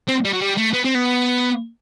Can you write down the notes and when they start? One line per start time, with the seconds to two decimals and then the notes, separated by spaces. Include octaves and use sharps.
0.08 C4
0.25 G3
0.33 F#3
0.41 G3
0.57 A3
0.73 B3
0.85 C4
0.95 B3